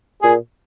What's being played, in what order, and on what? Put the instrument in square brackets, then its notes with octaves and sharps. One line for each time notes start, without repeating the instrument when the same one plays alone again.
[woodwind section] A#2 G#4